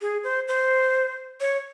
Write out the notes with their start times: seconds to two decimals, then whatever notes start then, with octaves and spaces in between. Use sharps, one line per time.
0.01 G#4
0.24 C5
0.48 C5
1.40 C#5